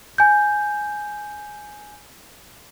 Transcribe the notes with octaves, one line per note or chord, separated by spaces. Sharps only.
G#5 G6